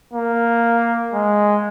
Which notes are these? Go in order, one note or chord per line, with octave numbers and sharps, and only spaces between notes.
A#3
G#3